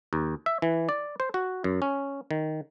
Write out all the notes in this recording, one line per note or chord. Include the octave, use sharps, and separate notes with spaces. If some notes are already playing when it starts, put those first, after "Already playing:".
D#2
E5
E3
D5
C5
F#4
F#2
C#4
D#3